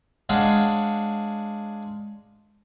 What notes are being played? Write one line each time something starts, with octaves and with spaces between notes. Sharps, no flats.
G#3 D4 C#5 F5 F#5 G#5